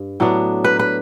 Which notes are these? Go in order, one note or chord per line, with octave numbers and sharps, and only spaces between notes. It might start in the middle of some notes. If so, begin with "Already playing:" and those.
Already playing: G2
A2 F#3 B3 D4
B4
B4